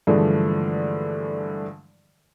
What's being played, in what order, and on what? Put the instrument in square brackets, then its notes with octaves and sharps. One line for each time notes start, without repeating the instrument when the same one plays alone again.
[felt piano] G2 D3 E3 F3 G#3 A3